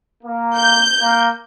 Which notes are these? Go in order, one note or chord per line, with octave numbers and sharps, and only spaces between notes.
A#3
G6
A#3